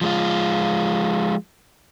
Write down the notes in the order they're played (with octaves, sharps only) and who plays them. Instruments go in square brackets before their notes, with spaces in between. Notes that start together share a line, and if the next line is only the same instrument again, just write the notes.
[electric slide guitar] F3 G#3 F4